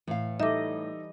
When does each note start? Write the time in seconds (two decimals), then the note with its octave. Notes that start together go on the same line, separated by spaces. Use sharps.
0.07 A2 E3 F5
0.40 G3 D#4 A4 D#5 E5 D6